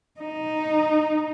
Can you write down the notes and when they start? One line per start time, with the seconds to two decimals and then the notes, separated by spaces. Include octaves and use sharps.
0.21 D#4